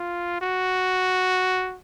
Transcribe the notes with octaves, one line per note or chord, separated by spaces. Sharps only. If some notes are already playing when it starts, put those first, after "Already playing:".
Already playing: F4
F#4